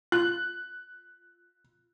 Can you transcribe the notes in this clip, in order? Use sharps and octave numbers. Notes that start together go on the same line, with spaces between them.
F4 F#6